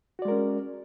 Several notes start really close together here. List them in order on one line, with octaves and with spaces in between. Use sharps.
F#4 D5 G#3 A#4 C#4